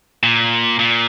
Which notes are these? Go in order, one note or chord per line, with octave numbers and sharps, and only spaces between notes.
A#2
A#2